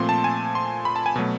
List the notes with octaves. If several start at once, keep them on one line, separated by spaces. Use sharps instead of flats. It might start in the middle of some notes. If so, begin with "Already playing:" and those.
Already playing: A#2 F3 A3 C4 C6
A5
G#5
C6
B5
A5
G#5
B2 F#3 A3